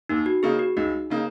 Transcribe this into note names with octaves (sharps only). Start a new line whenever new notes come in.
D#2 D#4
F#4
C#3 A#3 D#4 G#4
F#4
C#2 D#4
C#3 A#3 D#4